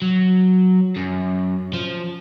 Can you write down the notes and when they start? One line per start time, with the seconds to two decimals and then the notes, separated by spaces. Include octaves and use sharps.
0.02 F#3
0.96 F#2
1.73 F3